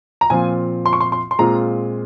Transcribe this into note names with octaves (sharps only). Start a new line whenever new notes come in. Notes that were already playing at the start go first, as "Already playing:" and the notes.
A#5
A#2 F3 C4 F4 G#5
C6
C#6
C6
C6
C6
A#2 G#3 C4 F4 A#5